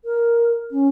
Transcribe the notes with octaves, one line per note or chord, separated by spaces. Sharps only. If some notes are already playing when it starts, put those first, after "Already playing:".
A#4
C#4